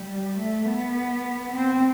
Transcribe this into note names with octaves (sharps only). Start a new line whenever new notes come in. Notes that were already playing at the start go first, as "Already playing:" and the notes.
Already playing: G3
A3
B3
C4